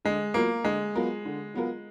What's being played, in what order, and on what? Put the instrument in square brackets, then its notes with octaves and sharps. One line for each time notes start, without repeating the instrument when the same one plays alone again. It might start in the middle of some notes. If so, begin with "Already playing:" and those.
[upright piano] D3 [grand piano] G#3
[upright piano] F#3 B3 F4 A#4 [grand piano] A#3
[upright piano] D3 [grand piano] G#3
[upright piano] F#3 B3 F4 A#4
D3
F#3 B3 F4 A#4